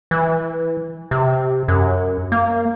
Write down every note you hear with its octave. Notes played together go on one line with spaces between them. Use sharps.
E3
C3
F#2
A#3